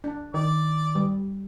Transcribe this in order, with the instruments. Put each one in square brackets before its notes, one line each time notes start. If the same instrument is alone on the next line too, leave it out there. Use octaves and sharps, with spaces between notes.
[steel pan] D4
[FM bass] D#3 [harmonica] D5
[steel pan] G3